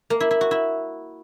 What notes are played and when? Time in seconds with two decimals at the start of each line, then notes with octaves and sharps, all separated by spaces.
0.10 A#3
0.20 E4
0.31 E4
0.41 F#4
0.51 E4